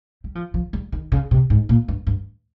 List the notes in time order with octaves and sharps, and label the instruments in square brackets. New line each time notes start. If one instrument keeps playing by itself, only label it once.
[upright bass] G3
F3
F3
G3
D#3
C#3
C3
G#2
A#2
G2
G2